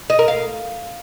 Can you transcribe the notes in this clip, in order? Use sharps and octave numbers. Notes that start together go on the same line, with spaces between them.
D#5
A#4
F5